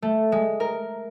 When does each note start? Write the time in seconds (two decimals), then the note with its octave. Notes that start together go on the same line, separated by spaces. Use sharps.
0.02 A3
0.32 G#3
0.60 A#4